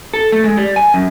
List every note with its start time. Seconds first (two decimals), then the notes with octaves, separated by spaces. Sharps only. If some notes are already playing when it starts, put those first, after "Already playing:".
0.14 A4
0.32 A3
0.44 G#3
0.57 G3
0.76 G#5
0.94 F#2